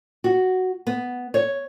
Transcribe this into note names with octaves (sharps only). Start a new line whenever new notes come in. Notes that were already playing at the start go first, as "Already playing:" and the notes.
F#4
B3
C#5